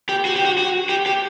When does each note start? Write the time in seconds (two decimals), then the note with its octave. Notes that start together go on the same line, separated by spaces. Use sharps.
0.09 G4
0.25 F#4
0.36 G4
0.45 F#4
0.58 F#4
0.89 G4
1.06 G4